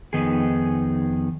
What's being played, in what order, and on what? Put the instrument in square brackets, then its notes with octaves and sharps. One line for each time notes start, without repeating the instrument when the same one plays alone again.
[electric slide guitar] F2 D#3 B3 D#4 G#4